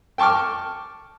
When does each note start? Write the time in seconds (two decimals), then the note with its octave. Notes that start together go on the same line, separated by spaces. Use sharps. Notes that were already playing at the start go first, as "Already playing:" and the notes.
0.18 G5 A5 C#6 D6 F6